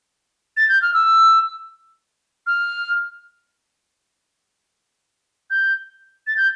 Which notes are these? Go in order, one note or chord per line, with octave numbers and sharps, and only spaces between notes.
A6
G6
F6
E6
F6
G6
A6
G6